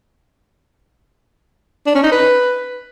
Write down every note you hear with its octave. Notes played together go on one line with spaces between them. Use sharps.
D4
C#4
D#4
B4